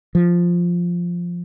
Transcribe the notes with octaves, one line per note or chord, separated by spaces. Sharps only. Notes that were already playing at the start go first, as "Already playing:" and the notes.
F3